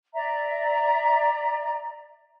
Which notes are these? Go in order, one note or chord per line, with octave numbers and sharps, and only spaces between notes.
D5 E5 A#5